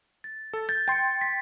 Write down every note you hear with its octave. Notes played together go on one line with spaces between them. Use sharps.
A6
A4
G6 A6
G5 C6 A6 C#7
B6